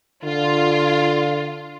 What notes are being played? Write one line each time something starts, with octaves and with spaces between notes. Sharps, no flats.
D3 F4